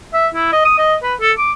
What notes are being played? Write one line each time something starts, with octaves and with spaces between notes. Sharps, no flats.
E5
E4
D#5
D#6
D#5
B4
A4
D6